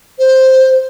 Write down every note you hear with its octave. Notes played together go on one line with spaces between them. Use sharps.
C5